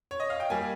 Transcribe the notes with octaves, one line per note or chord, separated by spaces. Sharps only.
C#5
D#5
F5
G5
G3 A#3 G#5